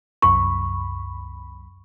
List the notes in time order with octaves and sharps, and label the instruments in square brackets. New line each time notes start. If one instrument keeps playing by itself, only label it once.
[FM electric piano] C2 F#2 B5 [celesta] C#6